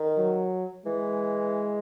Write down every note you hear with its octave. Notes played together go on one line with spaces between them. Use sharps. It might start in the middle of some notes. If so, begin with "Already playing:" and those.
Already playing: D#3
F#3
E3 G#3